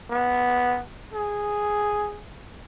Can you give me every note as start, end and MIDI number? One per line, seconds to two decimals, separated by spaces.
0.10 0.78 59
1.13 2.20 68